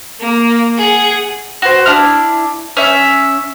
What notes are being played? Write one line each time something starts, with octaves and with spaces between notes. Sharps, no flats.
A#3
G#4 F#5
F#4 C5
D4 E4 F6
C#4 E5